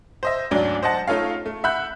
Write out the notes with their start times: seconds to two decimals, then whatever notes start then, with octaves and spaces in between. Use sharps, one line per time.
0.23 C5 D#5 E5
0.51 D2 G#2 F#3 D4 D5
0.83 C5 D#5 F#5 A5
1.08 A3 D#4 F4 A4 C#5 F5
1.46 A3
1.64 E5 F#5 B5 F#6 G6